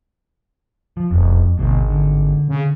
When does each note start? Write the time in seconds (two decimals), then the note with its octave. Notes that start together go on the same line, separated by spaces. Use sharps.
0.97 F3
1.11 E1 F2
1.58 G#1 D2 B2
1.90 D3
2.48 C#3